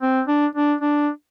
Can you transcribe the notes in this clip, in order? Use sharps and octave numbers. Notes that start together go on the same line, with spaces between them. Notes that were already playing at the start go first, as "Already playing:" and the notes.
C4
D4
D4
D4